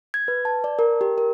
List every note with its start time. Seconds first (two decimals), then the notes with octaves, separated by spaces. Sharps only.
0.14 G#6
0.28 B4
0.45 A5
0.64 D5
0.79 A#4
1.01 G4
1.18 A#4